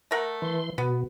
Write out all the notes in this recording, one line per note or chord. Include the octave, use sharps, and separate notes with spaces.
A3 A#4 F#5
E3 C6
B2 B3